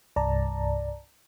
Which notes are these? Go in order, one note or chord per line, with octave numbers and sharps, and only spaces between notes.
C2 G2 D5 A5 A#5